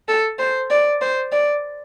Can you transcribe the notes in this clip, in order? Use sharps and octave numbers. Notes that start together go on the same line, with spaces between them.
A4
C5
D5
C5
D5